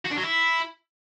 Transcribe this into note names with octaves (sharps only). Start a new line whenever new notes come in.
F#4
D4
F#3
E4